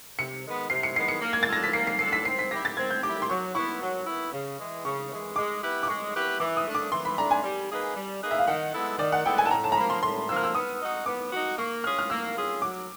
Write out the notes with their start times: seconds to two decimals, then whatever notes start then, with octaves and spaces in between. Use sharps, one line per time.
0.18 C3 C#7
0.44 D#3 G#3 B3
0.70 C3 C7
0.83 C#7
0.96 D#3 G#3 B3 C7
1.08 C#7
1.21 A#3
1.33 G#6
1.43 A6
1.48 D4 F4 A4 A#6
1.63 B6
1.73 A#3 C7
1.87 C7
1.99 D4 F4 A4 C7
2.13 B6
2.25 C4 C7
2.39 B6
2.51 E4 G4 A#6
2.65 A6
2.77 C4 G#6
2.90 G6
3.03 E4 G4 D6
3.22 C6
3.29 F#3 C#6
3.54 B3 E4 C#6
3.81 F#3
4.07 B3 E4
4.33 C#3
4.59 E3 G#3
4.84 C#3 C#6
5.11 E3 G#3
5.36 G#3 D6
5.62 B3 E4 G4 B4
5.83 D6
5.88 G#3 C#6
6.14 B3 E4 G4 B4
6.40 E3 D6
6.57 D#6
6.66 A3 D4
6.75 D6
6.92 E3 C6
7.05 B5
7.18 A3 D4 A#5
7.31 G#5
7.43 G3
7.69 A#3 D#4 G#4 B4
7.95 G3
8.22 A#3 D#4 G#4 B4
8.31 E5
8.38 F5
8.47 D#3 F#5
8.73 G#3 B3 E4 A4
8.98 D#3 D5
9.12 F#5
9.25 G#3 B3 E4 A4 G5
9.38 G#5
9.45 A5
9.50 A2 A#5
9.64 A5
9.72 A#5
9.77 F3 A#3 B5
9.90 C6
10.03 A2 C6
10.29 F3 A#3 E6
10.36 F6
10.44 E6
10.55 B3 D#6
10.80 D#4 F#4
11.06 B3 D6
11.33 D#4 F#4
11.58 A#3 C#6
11.84 C#4 F4 G#4 F6
11.99 F6
12.10 A#3 E6
12.36 C#4 F4 G#4
12.62 F#3 D6